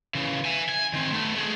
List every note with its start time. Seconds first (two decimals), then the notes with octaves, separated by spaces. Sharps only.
0.15 C#3 E3
0.45 E5 G#5
0.69 G#5
0.93 D#3 C4
1.12 A3 B3
1.35 A3 G#4